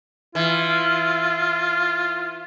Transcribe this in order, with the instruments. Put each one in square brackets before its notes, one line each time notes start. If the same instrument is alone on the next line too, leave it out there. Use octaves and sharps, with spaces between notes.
[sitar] E3 [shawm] F4